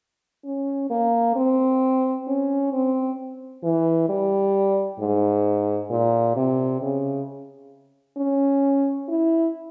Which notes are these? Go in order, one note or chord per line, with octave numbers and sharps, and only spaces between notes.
C#4
A#3
C4
C#4
C4
E3
G3
G#2
A#2
C3
C#3
C#4
E4